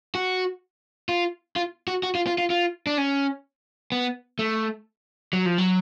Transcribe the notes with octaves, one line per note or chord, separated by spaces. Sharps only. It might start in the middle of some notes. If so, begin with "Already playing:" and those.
F#4
F4
F4
F#4
F#4
F4
F4
F4
F4
D4
C#4
B3
A3
F#3
F3
F#3